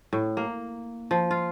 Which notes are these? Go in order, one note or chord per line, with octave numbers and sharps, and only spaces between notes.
A2
A#3
F3
F4